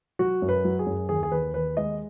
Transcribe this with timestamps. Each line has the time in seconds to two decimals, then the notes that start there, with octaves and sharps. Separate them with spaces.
0.19 F#3 F#4
0.42 F#2
0.49 B4
0.64 F#3
0.79 G#4
0.86 F#2
1.09 D#2 G#4
1.23 G#4
1.32 D#2 B4
1.54 D#2 B4
1.77 G#3 D#5